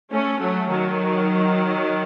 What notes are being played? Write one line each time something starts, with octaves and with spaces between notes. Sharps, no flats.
A3 C#4
F#3 A3
D#3 F#3